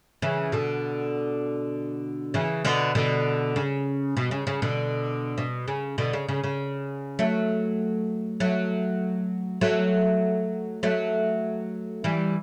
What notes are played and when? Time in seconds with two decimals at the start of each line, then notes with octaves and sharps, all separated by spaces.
0.22 C#3 E3
0.52 B2 D3
2.34 C#3 E3
2.65 B2 D3
2.95 B2 D3
3.56 C#3
4.17 B2
4.31 C#3
4.47 C#3
4.62 B2 D3
5.38 B2
5.68 C#3
5.98 B2 D3
6.13 C#3
6.29 C#3
6.44 C#3
7.19 F#3 A3
8.40 F#3 A3
9.61 F#3 A3
10.83 F#3 A3
12.04 E3 G3